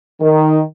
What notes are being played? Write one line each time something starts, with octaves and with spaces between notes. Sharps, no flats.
D#3